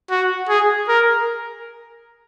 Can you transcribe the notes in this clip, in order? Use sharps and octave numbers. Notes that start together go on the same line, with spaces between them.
F#4
G#4
A#4